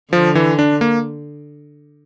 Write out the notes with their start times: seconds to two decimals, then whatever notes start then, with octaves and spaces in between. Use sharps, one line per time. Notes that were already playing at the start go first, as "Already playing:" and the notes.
0.13 D3 F3
0.35 E3
0.59 D4
0.81 A#3